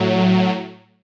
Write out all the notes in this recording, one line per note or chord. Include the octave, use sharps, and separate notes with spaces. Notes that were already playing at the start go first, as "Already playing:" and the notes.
Already playing: A2 F#3